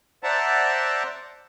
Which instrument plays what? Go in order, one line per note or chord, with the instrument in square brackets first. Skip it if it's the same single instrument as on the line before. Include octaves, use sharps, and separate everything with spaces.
[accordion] C5 D5 E5 F#5 A5 A#5